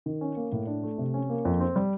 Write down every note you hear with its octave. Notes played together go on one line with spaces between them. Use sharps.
D#3
C#4
A#3
A2
D4
A3
C3
C#4
A#3
F2
C4
G3